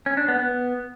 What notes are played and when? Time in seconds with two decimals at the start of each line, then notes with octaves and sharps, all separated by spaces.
0.06 C#4
0.17 D4
0.28 B3
0.39 B3